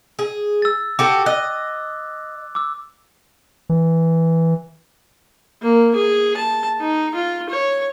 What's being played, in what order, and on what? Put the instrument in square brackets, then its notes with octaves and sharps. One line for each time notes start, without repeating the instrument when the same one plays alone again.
[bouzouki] G#4
[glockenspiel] E6 A6
[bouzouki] F#4 G4 A4 [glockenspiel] D6
[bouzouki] D#5 [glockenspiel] F#6
[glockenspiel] D6 E6
[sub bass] E3
[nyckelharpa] A#3
G#4
A5
D#4
F4
C#5